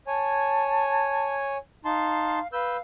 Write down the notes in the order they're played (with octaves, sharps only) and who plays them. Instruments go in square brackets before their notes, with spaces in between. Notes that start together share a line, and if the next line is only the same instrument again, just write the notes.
[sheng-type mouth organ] C#5 G#5 [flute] A5
[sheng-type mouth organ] D#4 A5 C6 [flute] F5
[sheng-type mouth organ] B4 E6 G6 [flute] F5